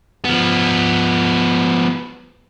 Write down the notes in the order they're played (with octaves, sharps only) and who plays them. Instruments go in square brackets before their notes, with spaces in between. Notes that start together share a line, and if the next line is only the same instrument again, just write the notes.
[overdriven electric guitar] F3 B3